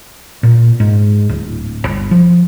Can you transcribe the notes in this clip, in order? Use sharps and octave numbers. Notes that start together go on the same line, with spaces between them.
A#2
G#2
D1
G1
F3